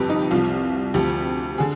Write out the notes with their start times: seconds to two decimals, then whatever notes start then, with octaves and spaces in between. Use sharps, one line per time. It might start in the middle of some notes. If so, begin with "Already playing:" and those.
Already playing: G1 F2 C3 G4 B4
0.09 D#4
0.31 C2 C3 F3 F4
0.94 D2 C3 F3 G4
1.58 D3 G#4